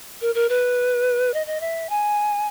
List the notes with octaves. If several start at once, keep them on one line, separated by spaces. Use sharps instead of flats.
A#4
A#4
B4
D#5
D#5
E5
G#5